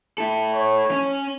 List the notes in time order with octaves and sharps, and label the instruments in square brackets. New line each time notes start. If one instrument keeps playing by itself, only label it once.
[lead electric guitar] E4 A4
[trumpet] C#5
[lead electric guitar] C#4